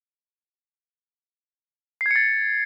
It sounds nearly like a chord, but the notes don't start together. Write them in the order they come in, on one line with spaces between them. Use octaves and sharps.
C7 G#6 C#7 A6